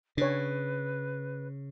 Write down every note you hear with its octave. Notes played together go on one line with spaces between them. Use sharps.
C#3 D4 B4 C#5